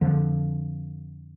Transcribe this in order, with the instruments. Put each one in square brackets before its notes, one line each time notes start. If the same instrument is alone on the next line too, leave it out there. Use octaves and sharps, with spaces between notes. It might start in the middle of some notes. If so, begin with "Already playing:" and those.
[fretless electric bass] F2 D3 F3